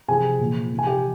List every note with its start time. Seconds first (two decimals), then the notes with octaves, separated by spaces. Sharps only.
0.08 C3 F3 G#4 G#5
0.39 A#2 F3
0.71 C3 F3
0.79 G#5
0.87 G4 G5